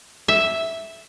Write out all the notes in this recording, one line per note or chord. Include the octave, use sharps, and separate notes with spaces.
E5